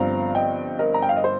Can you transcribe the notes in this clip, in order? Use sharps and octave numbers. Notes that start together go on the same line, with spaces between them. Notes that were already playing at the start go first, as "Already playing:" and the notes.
Already playing: G1 G2 F3 C4 F5 A#5
D#5 G5
A#4 D#5
A#5
G5
F5
D#5
C5